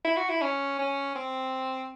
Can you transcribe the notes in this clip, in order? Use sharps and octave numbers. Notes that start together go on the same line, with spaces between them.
E4
F#4
E4
C#4
C#4
C4